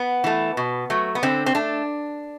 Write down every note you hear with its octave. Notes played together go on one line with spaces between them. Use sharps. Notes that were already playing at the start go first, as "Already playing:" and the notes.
Already playing: B3
E3 A3
B2
F#3 A3
B3
D3 C4
C4
A3 D4